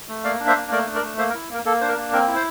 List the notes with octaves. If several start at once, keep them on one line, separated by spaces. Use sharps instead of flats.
A3
A#3 D5 F5
D4
C5 E5
A#3
A3 A#4 D5
D4
A#4 D5
A3
A#3 C5 E5
A#4
E4
A#3 A#4
A#3 A4
D4 C5
A#4
A#3
C4 A#4
E4
C5